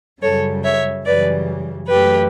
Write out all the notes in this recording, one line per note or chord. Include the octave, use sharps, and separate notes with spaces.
F#2 C#3 G3 A4 C#5
C#5 E5
F#2 C#3 E3 G3 B4 D5
F#2 E3 A3 G4 B4